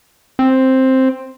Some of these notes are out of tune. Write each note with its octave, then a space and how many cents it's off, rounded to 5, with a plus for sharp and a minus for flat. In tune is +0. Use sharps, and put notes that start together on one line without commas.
C4 +5